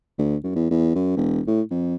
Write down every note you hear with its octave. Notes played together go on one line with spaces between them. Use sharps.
D2
F#2
E2
E2
F#2
E1
A2
F2